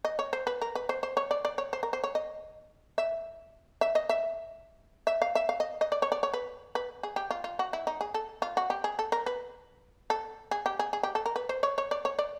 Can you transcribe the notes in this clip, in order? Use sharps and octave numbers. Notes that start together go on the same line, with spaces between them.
D#5
C#5
C5
B4
A#4
B4
C5
C5
C#5
D5
D5
C#5
C5
A#4
C5
C#5
D#5
E5
E5
D#5
E5
E5
F5
E5
F5
D#5
D#5
D5
C#5
D5
C#5
B4
B4
G#4
G4
F4
F4
F#4
E4
D#4
G#4
A4
F4
F#4
G4
G#4
A4
A#4
B4
A4
G#4
G4
G#4
G#4
G4
A4
A#4
B4
C5
C#5
C#5
D5
C#5
D5